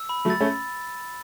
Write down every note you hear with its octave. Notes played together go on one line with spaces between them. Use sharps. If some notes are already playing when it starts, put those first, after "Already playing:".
Already playing: E6
B5
F#3 A3
A6
A3 C#4